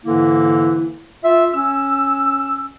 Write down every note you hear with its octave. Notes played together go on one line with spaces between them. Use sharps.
G#2 D3 E3 A#3 E4
F4 E5
C#4 E6